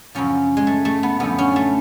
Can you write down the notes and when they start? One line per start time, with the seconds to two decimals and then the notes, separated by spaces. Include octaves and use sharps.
0.15 F#2 C#3 F3 C#4
0.57 G#3
0.67 A3
0.85 A3
1.03 B3
1.20 F#2 D3 F3 B3
1.39 C#4
1.56 A3